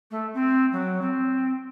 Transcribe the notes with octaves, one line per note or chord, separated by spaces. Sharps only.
A3
C4
F#3
C4